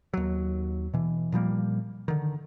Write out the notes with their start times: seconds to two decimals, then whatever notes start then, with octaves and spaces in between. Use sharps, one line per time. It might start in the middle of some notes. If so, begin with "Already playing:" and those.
0.14 D#2 F#3
0.93 B2 E3
1.32 A#2 F3 G3 A#3
2.08 D3 D#3